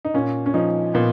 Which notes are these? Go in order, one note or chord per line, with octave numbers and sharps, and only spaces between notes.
D#4
A#2 C#4
C#4
F3 D#4
A#2 B3